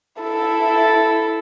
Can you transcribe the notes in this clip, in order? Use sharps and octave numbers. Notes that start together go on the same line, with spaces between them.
E4 A4